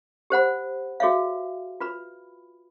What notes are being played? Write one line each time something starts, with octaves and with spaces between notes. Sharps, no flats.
G4 C5 F#5 B5
F#4 G#4 C#5 E5 F5
F4 B4 B5